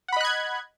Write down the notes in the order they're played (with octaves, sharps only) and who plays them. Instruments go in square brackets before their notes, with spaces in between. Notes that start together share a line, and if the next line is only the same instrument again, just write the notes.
[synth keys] F#5
B5
D#5
F#6
G#6